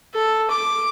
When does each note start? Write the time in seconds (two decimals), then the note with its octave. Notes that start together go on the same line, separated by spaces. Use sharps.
0.15 A4
0.50 D6